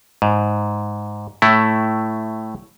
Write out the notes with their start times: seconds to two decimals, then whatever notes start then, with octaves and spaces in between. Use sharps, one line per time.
0.22 G#2
1.42 A2 A3 E4